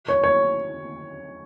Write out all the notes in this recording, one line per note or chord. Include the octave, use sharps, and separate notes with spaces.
C#5
C#5